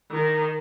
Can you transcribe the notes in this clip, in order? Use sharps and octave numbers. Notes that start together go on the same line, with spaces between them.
D#3